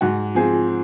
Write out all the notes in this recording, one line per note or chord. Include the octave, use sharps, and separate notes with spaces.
G#2 F#4
F3 C4 G#4